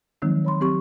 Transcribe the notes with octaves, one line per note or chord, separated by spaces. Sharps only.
D#3 F3 F#3 G#3 C4 D#4
C#5 B5 C6
F#3 C4 G4 C#6